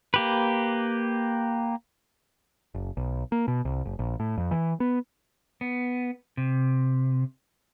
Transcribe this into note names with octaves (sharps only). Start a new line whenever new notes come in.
A#3 G4 B4
F#1
B1
A#3
B2
C2
F#1
A#1
A2
F2
E3
B3
B3
C3